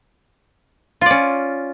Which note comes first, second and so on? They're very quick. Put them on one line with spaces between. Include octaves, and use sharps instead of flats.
F4 D5 C#4